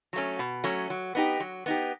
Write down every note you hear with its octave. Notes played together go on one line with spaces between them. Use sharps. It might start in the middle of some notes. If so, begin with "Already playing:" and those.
F#3 A3 C#4
B2
F#3 A3 C#4
F#3
B3 D#4 G4
F#3
B3 D#4 G4